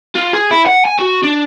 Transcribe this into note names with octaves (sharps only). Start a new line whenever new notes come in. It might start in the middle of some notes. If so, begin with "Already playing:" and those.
F4
G#4
E4
F#5
G#5
F#4
D4